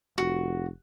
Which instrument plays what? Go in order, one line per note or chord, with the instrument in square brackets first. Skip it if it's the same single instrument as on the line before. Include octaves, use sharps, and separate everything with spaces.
[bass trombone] F1 [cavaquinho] F#4